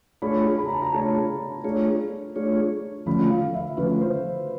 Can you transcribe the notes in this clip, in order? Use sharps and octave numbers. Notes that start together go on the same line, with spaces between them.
A3 D4 F4 G#4 C#5 B5
B5
A#5
A5
A#5
A3 D4 F4 G#4 C#5 A5
A3 D4 F4 G#4 C#5
A3 D4 F4 G#4 C#5
D3 F3 A3 C#4 F4 B5
F5
E5
D3 F3 A3 C#4 F4 B4
C5